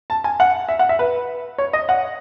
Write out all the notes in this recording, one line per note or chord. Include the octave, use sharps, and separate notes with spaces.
A5
G#5
F#5
E5
F#5
E5
B4
C#5
D#5
F#5